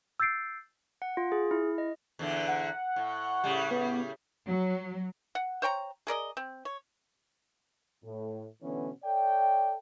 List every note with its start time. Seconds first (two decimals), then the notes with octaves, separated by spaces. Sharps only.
0.20 E6 G6 A6 C7 D7
1.02 F#5
1.17 F4
1.32 G#4
1.51 E4
1.78 D#5
2.19 E2 A#2 D3
2.48 F#5
2.96 A2
3.44 A2 C#3 G3
3.71 B3
4.48 F#3
5.35 F#5
5.62 C5 C#5 G5 A#5
6.07 G#4 A#4 D5 D#5
6.37 C4
6.65 C#5
8.05 A2
8.63 B2 D3 E3 A3 B3 C#4
9.05 A4 C#5 D5 E5 G5